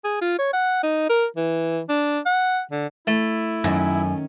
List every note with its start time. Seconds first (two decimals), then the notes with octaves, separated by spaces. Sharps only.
0.05 G#4
0.22 F4
0.39 C#5
0.53 F#5
0.83 D#4
1.09 A#4
1.36 E3
1.89 D4
2.26 F#5
2.71 D3
3.07 A3 E4
3.64 F#2 D#3 C#4 E5